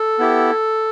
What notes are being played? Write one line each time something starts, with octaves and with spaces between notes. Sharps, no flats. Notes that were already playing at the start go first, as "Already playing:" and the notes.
Already playing: A4
B3 E4 G4